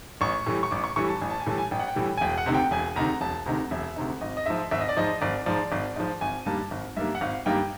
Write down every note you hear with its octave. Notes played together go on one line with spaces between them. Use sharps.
A1 C#6
A2 E3 G3
C#6
A1 D6
C#6
A2 E3 G3 C#6
A5
A1 G#5
A5
G#5
A2 E3 G3 A5
G#5
A1 G5
F#5
G5
A2 E3 G3
G#5
E1 G5
F#5
D2 C3 D#3
G5
E1 G#5
D2 C3 D#3 A#5
E1 A5
D2 C3 D#3 A#5
E1 E5
D2 C3 D#3
G#1 D#5
D#5
G#2 F3 E5
G#1 E5
D#5
D5
G#2 F3 D#5
G#1 D5
G#2 F3 D5
G#1
G#2 F3
G#1 G#5
G2 D#3 G3 A#3 A5
G#1
G2 D#3 G3 A#3 E5
F#5
G#1 F5
G2 D#3 G3 A#3 G5